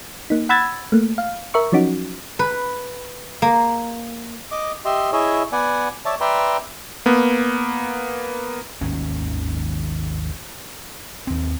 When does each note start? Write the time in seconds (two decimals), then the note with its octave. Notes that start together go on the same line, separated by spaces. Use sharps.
0.30 A#3 D#4
0.49 F#5 B5 E6 G#6 A6
0.92 A3 A#3
1.18 F5
1.54 A#4 E5 C#6
1.72 F3 F#3 C#4 D#4 F#4
2.39 B4
3.42 A#3
4.51 D#5 D6
4.85 G4 D#5 E5 C6
5.12 E4 G#4 C#5 D#5 E5
5.52 B3 D5 F#5 G#5
6.05 C#5 D5 E5 A5
6.21 B4 D5 E5 G5 A#5 C6
7.06 A#3 B3
8.81 G#1 D#2 D#3 C#4
11.27 D#2 C4